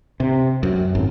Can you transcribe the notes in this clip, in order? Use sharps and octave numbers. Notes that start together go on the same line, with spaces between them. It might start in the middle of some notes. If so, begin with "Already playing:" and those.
C3
F#2
G#1